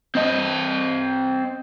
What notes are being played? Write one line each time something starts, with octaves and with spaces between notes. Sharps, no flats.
C4 D#5